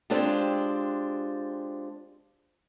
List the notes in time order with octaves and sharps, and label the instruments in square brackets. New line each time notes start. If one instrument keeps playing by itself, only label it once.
[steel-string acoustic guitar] G#3 C4 D4 F4 G4